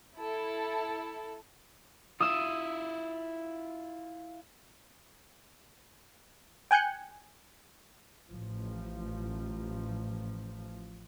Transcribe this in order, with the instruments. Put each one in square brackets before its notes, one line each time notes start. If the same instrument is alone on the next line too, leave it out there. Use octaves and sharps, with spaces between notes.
[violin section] E4 A4
[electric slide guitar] E4 F4 [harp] D#6 E6
[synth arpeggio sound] G5 G#5 F#6 G6 C#7
[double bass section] A1 F3